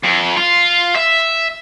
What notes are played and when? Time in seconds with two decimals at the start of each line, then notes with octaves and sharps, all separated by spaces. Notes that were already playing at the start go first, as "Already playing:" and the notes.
0.03 F2
0.37 F4
0.96 E5